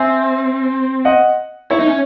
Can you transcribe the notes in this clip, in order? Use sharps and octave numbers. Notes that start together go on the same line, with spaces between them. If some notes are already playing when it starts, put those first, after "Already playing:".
Already playing: C4 E5 G#5
D#5 F#5
E4 C#5 E5
D#4
C#4